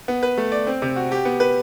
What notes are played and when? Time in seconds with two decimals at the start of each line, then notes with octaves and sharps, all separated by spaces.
0.08 B3
0.23 B4
0.37 A3
0.52 D5
0.67 C4
0.82 C3
0.96 F#4
1.12 G4
1.25 B3
1.40 B4